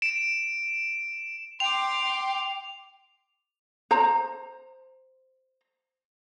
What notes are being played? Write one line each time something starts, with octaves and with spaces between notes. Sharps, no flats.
D7 E7
G5 C6 D6 F7
C5 A#5